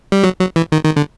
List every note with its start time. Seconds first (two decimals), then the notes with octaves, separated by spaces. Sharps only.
0.12 G3
0.24 F#3
0.39 F#3
0.56 E3
0.72 D#3
0.85 D#3
0.96 D3